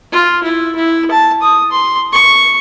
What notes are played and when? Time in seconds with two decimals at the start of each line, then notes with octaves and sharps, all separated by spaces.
0.12 F4
0.43 E4
0.75 E4
1.11 A5
1.42 D#6
1.71 C6
2.12 C#6